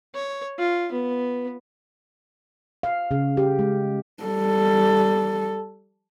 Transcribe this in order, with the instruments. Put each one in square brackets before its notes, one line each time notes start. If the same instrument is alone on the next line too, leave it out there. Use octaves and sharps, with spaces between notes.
[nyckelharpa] C#5
F4
B3
[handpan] F5
C#3
G4
G#3
[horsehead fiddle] G3 A4